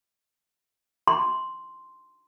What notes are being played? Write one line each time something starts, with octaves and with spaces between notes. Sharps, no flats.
C6